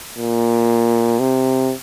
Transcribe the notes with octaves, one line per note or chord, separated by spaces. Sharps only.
A#2
C3